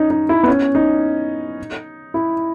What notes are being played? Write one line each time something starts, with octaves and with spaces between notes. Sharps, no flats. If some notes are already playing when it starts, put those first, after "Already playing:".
Already playing: C#4 D#4
D#4
E4
B3
C#4
D#4
E4